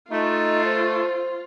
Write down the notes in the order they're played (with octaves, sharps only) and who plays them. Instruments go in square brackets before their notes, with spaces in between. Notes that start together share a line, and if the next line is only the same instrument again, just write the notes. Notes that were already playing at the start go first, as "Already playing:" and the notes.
[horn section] A3 [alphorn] D#4 [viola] F4
[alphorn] C5